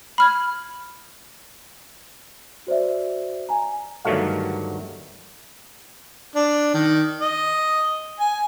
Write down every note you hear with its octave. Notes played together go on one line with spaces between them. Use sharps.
B5 F6 G#6
F#4 C5 D5 E5
G#5 A#5
G2 D3 D#3 F#3 A3 F5
D4
D#3
D#5
G#5